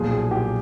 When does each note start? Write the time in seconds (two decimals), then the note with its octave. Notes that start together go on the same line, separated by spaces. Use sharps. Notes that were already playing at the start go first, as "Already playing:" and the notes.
Already playing: B1 A#2 F3 G#4
0.11 G#4
0.31 G4